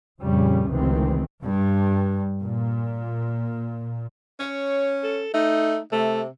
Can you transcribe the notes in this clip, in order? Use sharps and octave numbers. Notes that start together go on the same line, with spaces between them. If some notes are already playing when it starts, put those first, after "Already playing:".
F2 A#2 C#3 G3 C#4
F1 C#2 C3 D#3 E3 C4
G2
A#2
C#4 C#5
A4
A3 D#4
C3 A3